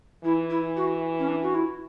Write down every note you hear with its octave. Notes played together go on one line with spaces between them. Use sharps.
E3 E4
E4
F#4
C#4
D4
F#4
E4